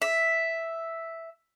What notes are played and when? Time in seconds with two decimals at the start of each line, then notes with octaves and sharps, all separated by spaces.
0.02 E5